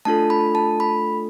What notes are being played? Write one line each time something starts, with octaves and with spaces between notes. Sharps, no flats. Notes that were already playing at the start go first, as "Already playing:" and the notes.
A3 D4 F4 A4 A5
B5
A5
B5